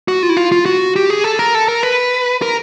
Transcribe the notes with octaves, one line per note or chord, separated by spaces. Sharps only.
F#4
F4
E4
F4
F4
F#4
G4
G#4
A4
A#4
A4
A#4
B4
A#4